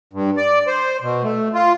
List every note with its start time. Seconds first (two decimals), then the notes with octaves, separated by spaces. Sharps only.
0.13 G2
0.37 D5
0.67 C5
1.02 B2
1.24 A3
1.54 F4